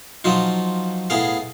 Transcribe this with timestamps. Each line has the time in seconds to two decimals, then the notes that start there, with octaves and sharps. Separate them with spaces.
0.24 F3 F#3 D#4 F4
1.10 A2 B3 G#4 F5